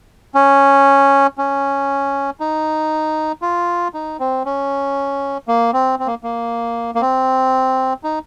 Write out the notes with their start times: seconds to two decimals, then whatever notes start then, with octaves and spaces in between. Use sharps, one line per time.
0.35 C#4
1.38 C#4
2.40 D#4
3.42 F4
3.94 D#4
4.20 C4
4.45 C#4
5.48 A#3
5.73 C4
5.99 C4
6.07 A#3
6.23 A#3
6.95 A#3
7.01 C4
8.04 D#4